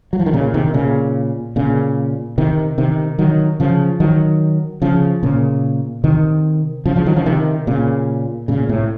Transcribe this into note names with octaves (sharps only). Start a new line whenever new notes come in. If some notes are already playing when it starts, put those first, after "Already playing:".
F#3
F3
D#3
A#2 C#3
C3 D#3
A#2 C#3
A#2 C#3
C3 D#3
C3 D#3
D#3 F#3
C#3 F3
D#3 F#3
C#3 F3
A#2 C#3
C3 D#3
C#3 F3
C#3 F3
D#3 F#3
C#3 F3
C3 D#3
A#2 C#3
A#2 C#3
A2 C3